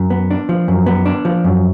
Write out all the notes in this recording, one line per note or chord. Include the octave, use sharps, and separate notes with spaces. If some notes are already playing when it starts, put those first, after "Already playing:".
Already playing: F#2
B3
D4
F3
F#2
B3
D4
F3
F#2